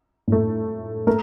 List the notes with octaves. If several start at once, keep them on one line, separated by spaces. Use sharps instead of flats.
A2 A3
A3 A#4